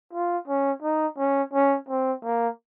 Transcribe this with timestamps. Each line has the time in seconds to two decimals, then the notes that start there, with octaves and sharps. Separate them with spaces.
0.13 F4
0.47 C#4
0.82 D#4
1.18 C#4
1.53 C#4
1.88 C4
2.24 A#3